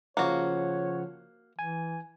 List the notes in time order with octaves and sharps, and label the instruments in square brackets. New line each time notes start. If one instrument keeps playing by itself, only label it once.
[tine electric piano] C#3 F3 F#5 [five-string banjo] A#3 F#4 [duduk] C#5
[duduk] E3 [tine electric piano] G#5